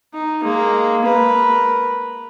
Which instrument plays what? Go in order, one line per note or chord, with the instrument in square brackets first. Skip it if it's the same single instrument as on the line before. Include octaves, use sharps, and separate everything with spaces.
[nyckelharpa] D#4
G#3 A#3
A#4 B4